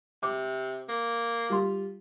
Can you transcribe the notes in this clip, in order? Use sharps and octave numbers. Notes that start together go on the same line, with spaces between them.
C3 D6
A#3
G3 F4 C6